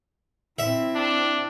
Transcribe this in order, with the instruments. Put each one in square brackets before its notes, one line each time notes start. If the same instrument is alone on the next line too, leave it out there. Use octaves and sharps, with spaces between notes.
[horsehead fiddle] C4 E4 [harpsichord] E5
[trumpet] D4